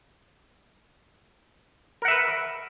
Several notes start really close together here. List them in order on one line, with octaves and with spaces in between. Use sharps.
A#4 F#5 E5 B4